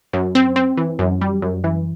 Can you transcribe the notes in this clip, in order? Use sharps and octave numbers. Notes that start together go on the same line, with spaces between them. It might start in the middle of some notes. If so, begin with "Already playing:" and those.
F#2
C4
C4
E3
F#2
G3
F#2
E3